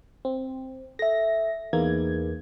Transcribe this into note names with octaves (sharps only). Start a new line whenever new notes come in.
C4
A4 E5 A#6
E2 A#3 D#4 G#4 B4 G#6